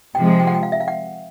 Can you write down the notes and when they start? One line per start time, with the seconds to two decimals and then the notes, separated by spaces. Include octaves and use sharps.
0.15 C3 F3 G#3 G5
0.40 G5
0.47 F#5
0.55 G5
0.63 F5
0.72 E5
0.80 F5
0.88 F#5